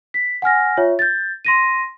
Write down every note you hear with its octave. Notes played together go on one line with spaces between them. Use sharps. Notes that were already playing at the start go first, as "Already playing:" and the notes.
B6
F#5 G#5 F6 A#6
F4 C#5 E5
G6 A6
C6 A#6 D#7